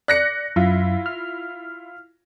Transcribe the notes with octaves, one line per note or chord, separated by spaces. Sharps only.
D5 F#6 A#6 C#7
F#2 E4 F4
F6